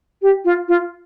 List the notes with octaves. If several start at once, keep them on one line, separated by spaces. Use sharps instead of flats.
G4
F4
F4